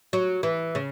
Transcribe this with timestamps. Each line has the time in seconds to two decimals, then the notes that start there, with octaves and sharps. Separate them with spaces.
0.13 F#3
0.43 E3
0.75 C#3